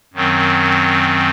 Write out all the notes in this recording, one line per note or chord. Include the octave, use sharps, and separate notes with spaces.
F#2 D#3 F#3 C4